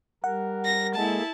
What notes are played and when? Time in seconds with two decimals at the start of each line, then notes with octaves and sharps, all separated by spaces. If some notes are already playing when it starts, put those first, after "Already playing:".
0.24 G3 A#4 F#5
0.65 A#6
0.95 G#3 A#3 E4 G#4 A4 A5